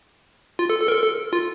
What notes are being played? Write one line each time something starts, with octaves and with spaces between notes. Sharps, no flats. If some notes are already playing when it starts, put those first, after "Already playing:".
F4
A4
A4
A#4
A4
A4
F4